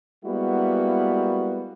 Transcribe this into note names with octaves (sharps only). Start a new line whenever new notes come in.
G3 G#3 A#3 B3 E4 F#4